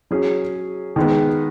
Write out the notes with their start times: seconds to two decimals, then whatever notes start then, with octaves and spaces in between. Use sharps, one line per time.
0.11 F#3 C#4 G#4
0.96 D#3 G#3 B3